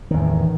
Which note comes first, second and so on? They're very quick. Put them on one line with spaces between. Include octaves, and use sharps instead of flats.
D#3 E2 A2